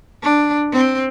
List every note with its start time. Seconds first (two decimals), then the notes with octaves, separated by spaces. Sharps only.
0.23 D4
0.72 C4